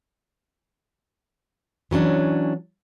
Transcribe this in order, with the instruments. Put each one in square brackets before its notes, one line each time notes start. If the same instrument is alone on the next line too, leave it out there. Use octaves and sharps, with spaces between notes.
[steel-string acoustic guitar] E3 F#3 C#4 D4